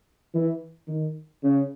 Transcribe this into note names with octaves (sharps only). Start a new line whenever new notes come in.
E3
D#3
C#3